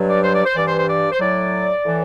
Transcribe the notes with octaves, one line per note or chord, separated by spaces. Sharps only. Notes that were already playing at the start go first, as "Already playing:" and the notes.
Already playing: G2 F#3
D5
C5
D5
C5
G2 E3 D5
C5
C5
D5
C5
A2 F#3 D5
A2 E3